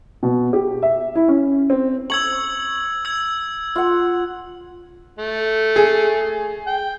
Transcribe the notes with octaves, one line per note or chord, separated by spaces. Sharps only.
B2
G4
E5
E4
C#4
C4
C#6 E6 G#6 F#7
E6 G#6
F4 F#5
A3
G#4
G5